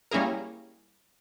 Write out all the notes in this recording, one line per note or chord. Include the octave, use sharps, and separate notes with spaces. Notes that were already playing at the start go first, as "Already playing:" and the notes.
G3 A#3 C#4 E4 G#4 A#4